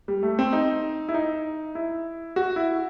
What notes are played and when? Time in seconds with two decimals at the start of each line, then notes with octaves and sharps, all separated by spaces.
0.08 G3
0.23 A3
0.39 C4
0.53 D#4
1.09 E4
1.14 D#4
1.75 E4
2.36 F#4
2.56 E4